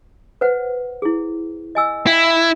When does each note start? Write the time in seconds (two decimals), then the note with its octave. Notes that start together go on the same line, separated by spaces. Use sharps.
0.41 B4 C5 F#5
1.02 E4 G#4
1.75 D#5 G#5 E6
2.07 E4 F5 G5